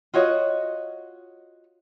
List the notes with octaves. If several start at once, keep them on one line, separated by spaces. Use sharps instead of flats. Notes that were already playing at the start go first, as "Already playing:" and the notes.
F4 F#4 C#5 D#5